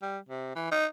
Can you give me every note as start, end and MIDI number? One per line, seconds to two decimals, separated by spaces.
0.02 0.18 55
0.29 0.56 48
0.56 0.68 52
0.71 0.86 63